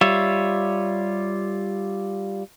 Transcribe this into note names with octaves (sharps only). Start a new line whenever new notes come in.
G3 F4 C#5 E5